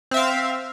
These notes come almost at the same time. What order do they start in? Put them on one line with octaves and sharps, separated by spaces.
C4 E5 F5